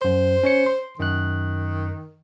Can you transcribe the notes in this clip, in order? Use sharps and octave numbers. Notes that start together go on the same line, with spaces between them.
F#2 C5 C6
C#4 C#5 C#7
C6
F#2 D#3 F#6